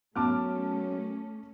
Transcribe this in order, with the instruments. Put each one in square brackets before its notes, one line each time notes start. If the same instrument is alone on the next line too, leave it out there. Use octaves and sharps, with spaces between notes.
[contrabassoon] F#2 [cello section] A3 C#4 [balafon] B3 [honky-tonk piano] A5 D6 F6